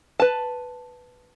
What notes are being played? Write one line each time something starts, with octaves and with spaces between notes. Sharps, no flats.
B4 A5